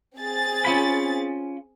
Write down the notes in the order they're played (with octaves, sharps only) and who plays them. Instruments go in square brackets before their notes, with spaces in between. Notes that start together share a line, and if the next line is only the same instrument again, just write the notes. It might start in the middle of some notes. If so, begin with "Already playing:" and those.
[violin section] C4 G#4 A6
[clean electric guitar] C#4 F4 B5